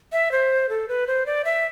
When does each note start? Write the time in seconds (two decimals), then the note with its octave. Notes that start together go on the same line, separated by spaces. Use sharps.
0.12 E5
0.32 C5
0.69 A4
0.88 B4
1.07 C5
1.26 D5
1.45 E5